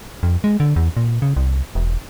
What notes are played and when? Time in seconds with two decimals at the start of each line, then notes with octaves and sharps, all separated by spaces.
0.23 F2
0.44 G#3
0.60 D3
0.76 E2
0.97 A#2
1.22 C#3
1.36 C2
1.75 E1